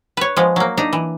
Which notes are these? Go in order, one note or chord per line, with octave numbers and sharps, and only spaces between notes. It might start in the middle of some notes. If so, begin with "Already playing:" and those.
B4 C#5
F3 G#3 B3
F#3 A#3
D4 D#4 A#5
E3